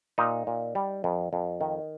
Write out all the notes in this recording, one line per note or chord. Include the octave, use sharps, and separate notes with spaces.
A#2 D#4
A#2
G3
F2
F2
D#3